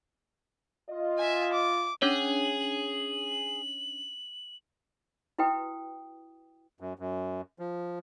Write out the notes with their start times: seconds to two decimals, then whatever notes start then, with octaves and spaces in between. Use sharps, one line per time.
0.89 F4 D#5
1.19 E5 G#5
1.53 D6
2.02 C#4 D4 G#4 C#5 F#7
5.39 E4 F#4 B4 G5 D#6
6.80 F#2
6.99 F#2
7.59 F3